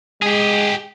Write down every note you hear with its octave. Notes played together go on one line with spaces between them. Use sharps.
G#3 G4 G#4